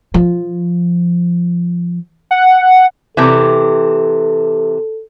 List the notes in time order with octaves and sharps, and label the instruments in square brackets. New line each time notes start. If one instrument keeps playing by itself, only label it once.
[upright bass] F3
[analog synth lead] F#5
[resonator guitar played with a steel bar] C3 E3 [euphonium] A4